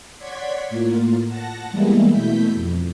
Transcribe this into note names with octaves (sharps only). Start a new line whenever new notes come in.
C#5 D5 F#5 C6 G#6 B6
A2 A#3 F4
F#5 A5 A#6
E3 G3 G#3 A#3 B3 E4
B2 A3 E4 G6 B6
F2